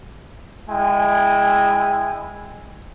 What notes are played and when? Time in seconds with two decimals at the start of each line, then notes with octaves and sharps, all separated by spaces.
0.70 G#3 E4 G5 G#5